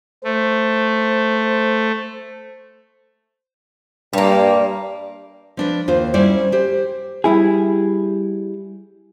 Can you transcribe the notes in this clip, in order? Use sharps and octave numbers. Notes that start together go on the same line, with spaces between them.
A3 C5
G2 G3 A#3
F3 D4 B4
D#2 F4 C5
G3 C#4 E4 C5 D5
G4 C5
G3 E4 G#4